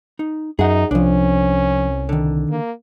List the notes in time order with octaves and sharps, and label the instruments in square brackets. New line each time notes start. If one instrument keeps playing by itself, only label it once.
[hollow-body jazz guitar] D#4
[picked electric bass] F#2 [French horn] D#4 [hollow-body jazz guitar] G#4 F#5
[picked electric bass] C2 [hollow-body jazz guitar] F3 D4 [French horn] C#4
[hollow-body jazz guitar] D3 D#3
[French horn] A#3